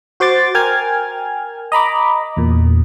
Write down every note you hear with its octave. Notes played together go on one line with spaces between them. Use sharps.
F#4 C5 C6 D6 A6
A#4 G5 G#5 F6 G#6
D#5 A#5 B5 D6
E2 A#2